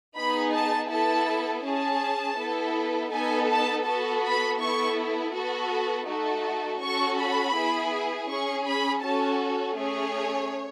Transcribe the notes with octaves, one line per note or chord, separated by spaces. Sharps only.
B3 D#4 G#4 B5
A5
B3 E4 A4 A5
C#4 G#4 A5
B3 E4 A4
B3 D#4 A4 G#5
A5
B3 F#4 A4 A5
B5
B3 E4 A4 C#6
B3 F#4 A4
A3 D#4 F#4 A4
C#4 F#4 A4 C#6
B5
B3 E4 G#4
C#4 G#4 C#6
B5
C#4 F#4 A4 A5
A3 C#4 G#4 C#5